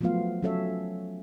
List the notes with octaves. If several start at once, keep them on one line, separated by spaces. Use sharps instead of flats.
F3 F#3 A3 B3 F4 F5
F#3 C#4 A4 C#5 E5